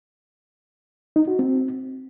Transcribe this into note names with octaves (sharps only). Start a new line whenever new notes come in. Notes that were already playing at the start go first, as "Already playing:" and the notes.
D#4
F#4
C4